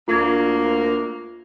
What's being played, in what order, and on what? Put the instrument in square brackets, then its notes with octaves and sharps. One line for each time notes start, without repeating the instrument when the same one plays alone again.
[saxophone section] D2 A#3 [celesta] F4 G#6